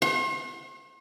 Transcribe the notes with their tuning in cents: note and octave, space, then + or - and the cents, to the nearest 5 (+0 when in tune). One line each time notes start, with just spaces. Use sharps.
C6 +45